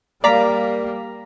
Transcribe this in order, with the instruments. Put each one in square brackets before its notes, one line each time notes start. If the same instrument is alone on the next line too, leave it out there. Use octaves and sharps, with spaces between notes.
[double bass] G3 A#3 [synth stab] D5 F5 B6 [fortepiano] A#5